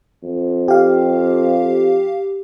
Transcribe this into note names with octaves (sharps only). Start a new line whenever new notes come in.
F2
G4 F5